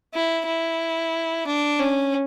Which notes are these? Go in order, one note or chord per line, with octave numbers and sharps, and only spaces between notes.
E4
E4
D4
C#4